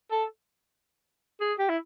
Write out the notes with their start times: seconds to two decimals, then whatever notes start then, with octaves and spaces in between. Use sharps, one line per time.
0.11 A4
1.41 G#4
1.59 G4
1.69 E4